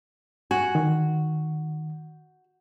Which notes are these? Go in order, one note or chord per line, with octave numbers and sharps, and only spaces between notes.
F#4 G#5
D#3